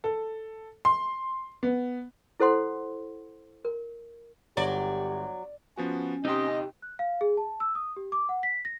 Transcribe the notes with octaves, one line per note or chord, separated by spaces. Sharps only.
A4
C6
B3
E4 A4 C5 F#5 C6
A#4
G1 F#3 G4 D5
F3 B3 C#4 F#4
C3 D#4 G4 D#5 C6
F#6
F5
G#4
A5
E6
D#6
G4
D6
F#5
B6
A#6